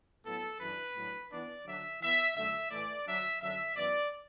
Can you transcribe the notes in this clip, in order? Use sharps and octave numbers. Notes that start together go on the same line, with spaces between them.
A2 F#3 B3 E4 A4
F#2 E3 D4 B4
A2 F#3 D4
E3 B3 D4 D5
D3 F#3 D4 E5
E3 B3 E4 E5
F#2 D3 A3 E5
A2 E3 A3 E4 D5
D3 F#3 D4 E5
F#2 D3 F#3 D4 E5
F#2 E3 B3 D5